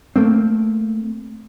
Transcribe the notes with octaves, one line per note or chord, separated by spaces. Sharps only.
A3 A#3 C4